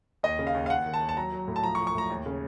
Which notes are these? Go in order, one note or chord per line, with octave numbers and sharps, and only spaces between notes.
D#2 D#5
C#3
F5
D#2
F5
D#2 F#5
D#3
A5
D#2
A5
F#3 A#5
F#3
A2
A5
F3 A#5
C#6
F3
C#6
A2 A#5
D#2
C#3